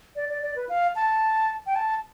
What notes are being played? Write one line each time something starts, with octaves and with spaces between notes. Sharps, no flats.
D5
D5
D5
B4
F5
A5
G5
A5